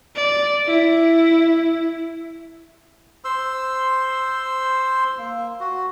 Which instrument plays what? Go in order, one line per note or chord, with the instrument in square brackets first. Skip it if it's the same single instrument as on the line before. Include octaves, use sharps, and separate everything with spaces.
[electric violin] D5
E4
[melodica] C5 C6 E6
A#3
F#4